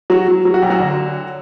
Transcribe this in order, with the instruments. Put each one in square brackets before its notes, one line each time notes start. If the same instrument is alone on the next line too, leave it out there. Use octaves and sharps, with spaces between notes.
[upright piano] F#3 F#4
F#3
F#3
F#4
B1 G4
F#3 F#4
D3